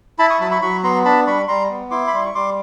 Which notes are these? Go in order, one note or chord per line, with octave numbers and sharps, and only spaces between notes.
E4 A5 B5
C#6 D#6
F#3 A5 B5
B5 C#6
F#3 B5 C#6
B3 A#5 C6
D4 A5 B5
G3 B5 C#6
G3 A#5 C6
B3
E4 C6 D6
B5
G3 C6
C#6
G3 C6 D6